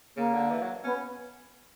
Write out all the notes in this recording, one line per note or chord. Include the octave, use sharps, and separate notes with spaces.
C#3 A#3
D3
E3
F#3
B3 C#4